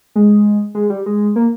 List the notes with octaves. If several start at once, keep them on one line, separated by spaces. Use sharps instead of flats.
G#3
G#3
G3
G#3
A#3